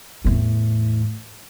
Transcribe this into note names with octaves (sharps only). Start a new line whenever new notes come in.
E2 A2